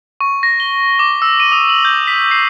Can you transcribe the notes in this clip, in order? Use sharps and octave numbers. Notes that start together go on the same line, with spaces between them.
C#6
A#6
G7
D6
E6
D#7
D#6
F#7
G6
B6
C7